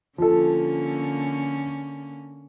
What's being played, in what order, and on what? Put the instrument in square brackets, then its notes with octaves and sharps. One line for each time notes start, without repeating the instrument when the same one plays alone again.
[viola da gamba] D3 A#3 C#4 [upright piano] F3 A4